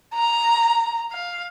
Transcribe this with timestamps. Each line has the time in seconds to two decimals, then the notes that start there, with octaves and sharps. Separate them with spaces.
0.14 A#5
1.12 F5